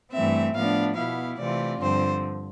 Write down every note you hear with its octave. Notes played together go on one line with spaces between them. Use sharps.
G2 E3 A3 C4 E5
A2 F3 B3 D4 F5
B2 B3 E4 F5
C3 E3 A3 C4 F4 D5
G2 D3 F3 C4 C5